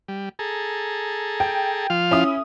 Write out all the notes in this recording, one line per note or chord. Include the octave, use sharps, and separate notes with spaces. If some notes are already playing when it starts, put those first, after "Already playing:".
G3
G#4 A4 A#5
G5
F3 F4 F5
C#4 E4 D#6